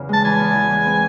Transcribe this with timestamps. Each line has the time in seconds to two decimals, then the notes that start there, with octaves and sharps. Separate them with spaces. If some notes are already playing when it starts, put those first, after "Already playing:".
Already playing: E2 C#3
0.09 G#3 A5
0.25 E3 G#5
0.39 E2
0.55 E3
0.71 G#3
0.86 C4